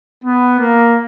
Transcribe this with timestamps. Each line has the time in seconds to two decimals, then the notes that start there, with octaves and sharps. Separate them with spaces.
0.25 B3
0.59 A#3